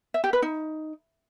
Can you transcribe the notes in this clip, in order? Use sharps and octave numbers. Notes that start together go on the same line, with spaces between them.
E5
G4
B4
D#4